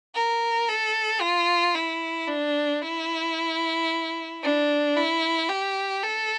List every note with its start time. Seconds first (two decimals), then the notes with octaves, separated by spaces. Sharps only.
0.15 A#4
0.68 A4
1.21 F4
1.75 E4
2.28 D4
2.81 E4
4.43 D4
4.96 E4
5.49 G4
6.03 A4